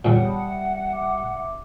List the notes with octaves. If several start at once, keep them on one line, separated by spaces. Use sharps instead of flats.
E2 A#2 G3 B3 G4 C#5 F#5
A5 B5 D#6
E5
E5 D6